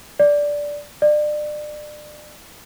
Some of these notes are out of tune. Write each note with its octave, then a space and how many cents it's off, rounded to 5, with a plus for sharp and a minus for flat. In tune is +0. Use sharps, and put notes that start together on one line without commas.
D5 -10
D5 +30